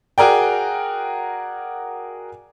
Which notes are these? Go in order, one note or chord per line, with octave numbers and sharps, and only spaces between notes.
F#4 G#4 A#4 D5 G5